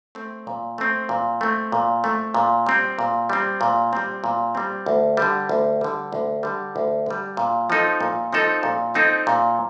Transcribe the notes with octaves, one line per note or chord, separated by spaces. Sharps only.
A3 C4
A#2
A3 C4
A#2
A3 C4
A#2
A3 C4
A#2
G3 C4
A#2
G3 C4
A#2
G3 C4
A#2
G3 C4
D2
D3 G3
D2
D3 G3
D2
D3 G3
D2
D3 G3
A#2
F3 C4 D#4 A4
A#2
F3 C4 D#4 A4
A#2
F3 C4 D#4 A4
A#2